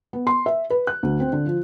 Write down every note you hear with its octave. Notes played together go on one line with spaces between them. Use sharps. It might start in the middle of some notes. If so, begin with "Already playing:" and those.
B3
C6
E5
B4
F#6
D2
C4
D3
F3